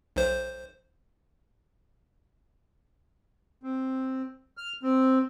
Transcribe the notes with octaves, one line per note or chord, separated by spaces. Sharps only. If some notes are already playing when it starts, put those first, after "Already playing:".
B1 C5
C4
F6
C4